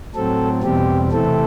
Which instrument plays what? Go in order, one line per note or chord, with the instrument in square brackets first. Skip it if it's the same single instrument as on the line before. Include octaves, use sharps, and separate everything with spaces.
[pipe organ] A2 F#3 C4 A4
E2 B2 G3 C4 G4
C3 E3 A3 C4 A4